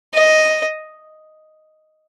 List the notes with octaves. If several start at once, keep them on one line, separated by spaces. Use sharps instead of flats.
D#5